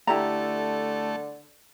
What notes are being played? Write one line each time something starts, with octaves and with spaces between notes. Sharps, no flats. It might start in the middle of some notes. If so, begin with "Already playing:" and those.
D3 A3 E4 G4 A#5